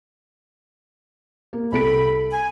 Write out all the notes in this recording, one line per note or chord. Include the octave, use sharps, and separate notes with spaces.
A#3
C2 A4 B5 D7
G#5